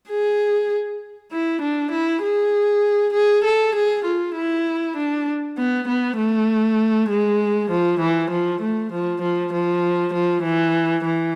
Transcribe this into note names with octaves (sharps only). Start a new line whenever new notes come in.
G#4
E4
D4
E4
G#4
G#4
A4
G#4
F4
E4
D4
B3
B3
A3
G#3
F3
E3
F3
A3
F3
F3
F3
F3
E3
E3